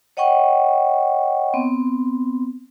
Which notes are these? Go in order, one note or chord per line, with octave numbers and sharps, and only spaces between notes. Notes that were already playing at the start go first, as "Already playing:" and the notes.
C#5 D#5 F#5 G5 C#6
B3 C4